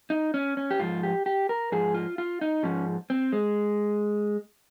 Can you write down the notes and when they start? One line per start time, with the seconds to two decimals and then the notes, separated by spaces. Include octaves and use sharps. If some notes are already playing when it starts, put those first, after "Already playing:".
0.10 D#4
0.34 C#4
0.57 C#4
0.71 G4
0.80 G#2 F3 F4
1.03 G4
1.26 G4
1.49 A#4
1.72 G#2 F3 G#4
1.94 F4
2.18 F4
2.41 D#4
2.63 G#2 F3 C#4
3.10 C4
3.32 G#3